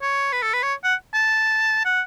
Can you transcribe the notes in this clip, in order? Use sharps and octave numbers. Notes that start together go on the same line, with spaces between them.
C#5
B4
A4
B4
C#5
F#5
A5
F#5